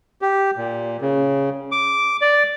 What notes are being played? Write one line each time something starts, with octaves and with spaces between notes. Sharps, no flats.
G4
A#2
C#3
D6
D5